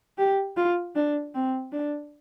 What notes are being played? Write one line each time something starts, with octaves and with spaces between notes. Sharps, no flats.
G4
F4
D4
C4
D4